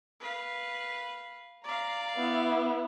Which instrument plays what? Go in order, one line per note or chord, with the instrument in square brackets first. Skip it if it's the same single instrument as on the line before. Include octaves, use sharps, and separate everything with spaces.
[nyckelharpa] B4 F5
[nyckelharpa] D5 F5 [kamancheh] A#5
[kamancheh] B3 E4